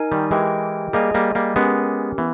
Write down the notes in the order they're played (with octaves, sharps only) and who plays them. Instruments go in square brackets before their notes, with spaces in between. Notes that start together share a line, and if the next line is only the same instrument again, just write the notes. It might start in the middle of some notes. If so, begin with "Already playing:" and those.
Already playing: [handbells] D#4 A#4 D#5 G#5
[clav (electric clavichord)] D#3 G3
[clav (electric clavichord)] E3 G#3 [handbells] E4 G4 A#4 D#5 G5
[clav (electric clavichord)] G3 A#3 [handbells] G#4 D#5 G#5
[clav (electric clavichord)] G3 A#3
G3 A#3
[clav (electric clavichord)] G#3 B3 [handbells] C#4 G4 A#4
[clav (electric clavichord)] E3 [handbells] B3